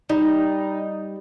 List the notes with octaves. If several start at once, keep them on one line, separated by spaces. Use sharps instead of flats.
G3 D#4